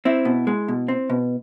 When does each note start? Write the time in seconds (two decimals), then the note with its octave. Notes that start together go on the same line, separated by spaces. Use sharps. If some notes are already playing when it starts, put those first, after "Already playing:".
0.05 C4 E4
0.25 B2
0.47 G#3
0.68 B2
0.88 C4
1.10 B2